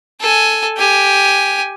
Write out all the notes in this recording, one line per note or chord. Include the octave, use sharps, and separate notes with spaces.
A4 G#5
G4 G#5